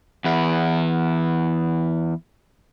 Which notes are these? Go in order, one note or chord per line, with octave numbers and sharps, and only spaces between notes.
E2 E4